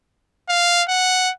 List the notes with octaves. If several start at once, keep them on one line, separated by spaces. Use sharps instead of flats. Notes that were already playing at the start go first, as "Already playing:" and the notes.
F5
F#5